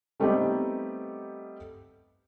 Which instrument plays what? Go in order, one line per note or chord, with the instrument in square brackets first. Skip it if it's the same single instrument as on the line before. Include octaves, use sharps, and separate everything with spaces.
[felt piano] G3 A3 B3 C4 D#4 G4